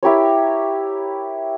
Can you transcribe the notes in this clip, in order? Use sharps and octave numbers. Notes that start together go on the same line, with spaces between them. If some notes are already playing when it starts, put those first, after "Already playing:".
E4 G4 A#4 C#5